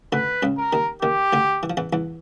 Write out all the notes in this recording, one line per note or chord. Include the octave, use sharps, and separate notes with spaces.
D2 D3 B4
C#2 C#3
A#4
D#2 D#3
D#2 D#3 G4
D2 D3
E3
F3
E2 E3
E2 E3